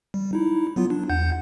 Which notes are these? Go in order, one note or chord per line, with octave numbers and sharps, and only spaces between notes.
G3
D#4 E4
F#3 B3 F4
D4
E2 F#5 G6